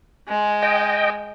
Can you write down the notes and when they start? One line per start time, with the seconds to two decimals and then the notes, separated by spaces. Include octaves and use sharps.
0.28 G#3
0.63 D#5 G5